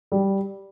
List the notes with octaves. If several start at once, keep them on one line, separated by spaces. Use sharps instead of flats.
G3